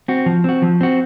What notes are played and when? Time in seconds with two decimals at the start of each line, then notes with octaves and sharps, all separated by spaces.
0.08 C4 F#4
0.26 F3
0.44 C4 F#4
0.63 F3
0.81 C4 F#4